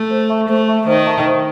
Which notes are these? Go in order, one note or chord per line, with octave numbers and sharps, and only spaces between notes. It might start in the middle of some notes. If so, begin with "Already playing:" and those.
Already playing: A3
C5
E5 A5 C#6
A3 C5
E5 A5 C#6
D#3 C5
E5 A5 C#6
C5